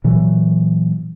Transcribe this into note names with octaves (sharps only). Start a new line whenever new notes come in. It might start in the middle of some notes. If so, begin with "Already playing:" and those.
A#2 E3 F#3